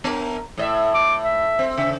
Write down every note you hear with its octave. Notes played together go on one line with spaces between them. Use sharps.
B3 A#4
A2 D#5 E5
A2 D6
E5
C4
C#3 E5